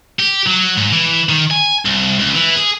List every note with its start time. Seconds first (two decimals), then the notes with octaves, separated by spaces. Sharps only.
0.19 G4
0.46 F#3
0.77 G#2
0.93 E3
1.29 D#3
1.51 G#5
1.85 C2
2.19 C#2
2.35 E3
2.56 G#4